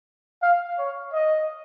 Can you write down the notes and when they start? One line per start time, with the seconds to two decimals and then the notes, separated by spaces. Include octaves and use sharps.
0.43 F5
0.79 C#5
1.13 D#5